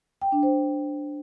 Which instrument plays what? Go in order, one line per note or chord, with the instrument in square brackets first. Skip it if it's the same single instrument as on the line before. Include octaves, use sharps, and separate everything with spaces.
[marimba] G5
D4
C5